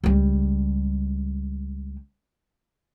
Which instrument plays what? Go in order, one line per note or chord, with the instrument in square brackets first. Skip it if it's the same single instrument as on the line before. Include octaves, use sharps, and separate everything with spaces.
[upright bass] C#2 G3